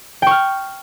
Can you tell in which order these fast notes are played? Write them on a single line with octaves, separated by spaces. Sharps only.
G5 C#6 F6